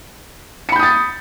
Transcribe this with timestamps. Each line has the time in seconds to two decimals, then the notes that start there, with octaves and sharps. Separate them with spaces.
0.69 C#7
0.72 B5
0.76 G6
0.79 D#6
0.83 A6